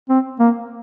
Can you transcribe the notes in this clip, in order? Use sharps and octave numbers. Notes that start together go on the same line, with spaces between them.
C4
A#3